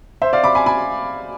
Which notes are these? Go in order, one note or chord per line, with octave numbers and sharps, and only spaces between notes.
C5 E5
D5 F5
B5 D6
G#5 B5
G#5 B5